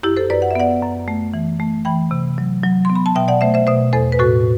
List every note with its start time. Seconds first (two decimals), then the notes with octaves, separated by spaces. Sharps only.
0.03 F#2 E4 G4
0.17 A4 C5
0.30 F#2 B4 D5
0.42 F#5
0.51 E5
0.55 B3 D5 F#5
0.82 F#2
1.08 A3
1.34 E3
1.60 A3
1.85 E3 G5 B5
2.11 C3
2.38 F#3
2.64 F#3
2.85 B3 C6
2.95 B5
3.06 A5
3.15 B2 E5 G5
3.28 D5 F#5
3.41 A3 C5 E5
3.54 C5 E5
3.67 B2 C5 E5
3.93 E2 A4 C5
4.12 B4
4.19 A2 F#4 A4